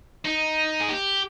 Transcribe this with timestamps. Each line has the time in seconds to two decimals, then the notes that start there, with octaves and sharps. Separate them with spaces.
0.25 D#4
0.81 G#4
0.90 G4